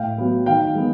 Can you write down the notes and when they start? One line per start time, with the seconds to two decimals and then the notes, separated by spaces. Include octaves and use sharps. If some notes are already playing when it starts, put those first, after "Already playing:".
Already playing: A2 F5 G5
0.18 F#3 B3
0.46 D#3 F5 G5
0.75 G#3 B3